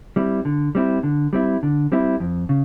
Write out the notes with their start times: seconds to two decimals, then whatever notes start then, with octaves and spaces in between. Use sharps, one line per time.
0.16 G3 C4 E4
0.45 D3
0.75 G3 C4 E4
1.03 D3
1.33 G3 C4 E4
1.63 D3
1.92 G3 C4 E4
2.20 F2
2.49 C#3